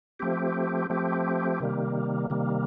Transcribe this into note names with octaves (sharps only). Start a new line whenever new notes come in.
F3 A3 C4 G4
F3 A3 C4 G4
C3 D#3 G3 A#3
C3 D#3 G3 A#3